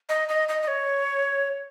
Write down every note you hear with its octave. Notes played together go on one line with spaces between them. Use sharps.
D#5
D#5
D#5
D#5
C#5